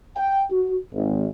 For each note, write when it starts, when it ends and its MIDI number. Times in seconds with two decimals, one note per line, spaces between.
0.16 0.42 79
0.51 0.76 66
0.92 1.27 32